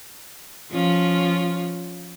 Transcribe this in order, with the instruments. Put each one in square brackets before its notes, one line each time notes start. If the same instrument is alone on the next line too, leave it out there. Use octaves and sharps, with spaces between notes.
[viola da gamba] F3 C#4 F4